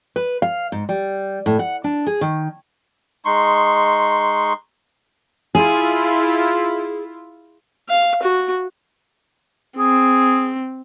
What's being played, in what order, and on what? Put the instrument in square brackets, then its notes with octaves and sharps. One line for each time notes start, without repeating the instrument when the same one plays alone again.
[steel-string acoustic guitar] B4
F5
G#2
G3
A2
F#5
D4
G#4
D#3
[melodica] G#3 D#4 C6 C#6
[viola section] E4 F4 [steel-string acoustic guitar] G#4
[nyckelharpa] F5
F#4
[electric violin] C4 [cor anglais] G#4